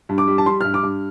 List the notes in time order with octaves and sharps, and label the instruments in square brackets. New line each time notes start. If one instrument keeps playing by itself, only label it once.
[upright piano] G2
D6
G3
A5
G3 C6
G2 F6
D6
G2